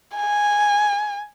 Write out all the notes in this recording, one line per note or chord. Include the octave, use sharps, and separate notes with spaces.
G#5